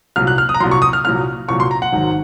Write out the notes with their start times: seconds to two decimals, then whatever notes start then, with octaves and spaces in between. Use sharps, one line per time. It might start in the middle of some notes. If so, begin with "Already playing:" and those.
0.16 C2 A#2 F#3 F6
0.27 F#6
0.38 F6
0.49 D#6
0.54 A#5
0.60 C2 A#2 F#3 C6
0.71 C#6
0.82 D#6
0.93 F6
1.04 C2 A#2 F#3 F6
1.48 C2 A#2 F#3 C#6
1.60 C6
1.71 A#5
1.82 F#5
1.92 G#1 G#2 D#3 F#3